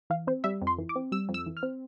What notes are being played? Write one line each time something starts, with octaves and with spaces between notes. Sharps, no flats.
E3 F5
C4 C5
G3 E5
F2
C6
E3
D6
C4
G3 E6
F2
E6
E3
F6
C4